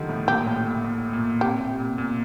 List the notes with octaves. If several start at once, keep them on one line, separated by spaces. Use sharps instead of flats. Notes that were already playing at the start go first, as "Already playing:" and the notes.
Already playing: D3 D#3 F3 G3 A3
A2
A#2 G4
A2
A#2
A2
A#2
C3 G4
A#2
A#2